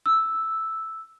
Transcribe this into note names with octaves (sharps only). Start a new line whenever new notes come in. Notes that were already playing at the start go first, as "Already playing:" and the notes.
E6